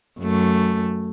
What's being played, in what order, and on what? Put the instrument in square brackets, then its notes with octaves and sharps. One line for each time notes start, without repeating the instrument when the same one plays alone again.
[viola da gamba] F#2 A3